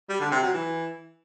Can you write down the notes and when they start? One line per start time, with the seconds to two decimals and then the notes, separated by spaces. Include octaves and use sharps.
0.09 G3
0.20 D3
0.31 C3
0.42 F#3
0.54 E3